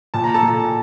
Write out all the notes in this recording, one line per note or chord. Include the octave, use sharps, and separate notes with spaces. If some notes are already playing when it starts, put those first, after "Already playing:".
A#2 A5
A#5
A4 A5
A#2